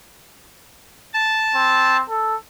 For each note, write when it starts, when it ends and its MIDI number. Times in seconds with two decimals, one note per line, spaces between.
1.13 1.97 81
1.55 2.02 60
2.10 2.36 69